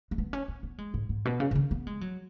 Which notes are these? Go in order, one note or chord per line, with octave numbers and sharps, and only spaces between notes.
G#3
B3
C#4
B3
B3
G#3
G#2
G#2
B2
C#3
C#3
D#3
B3
G#3
F#3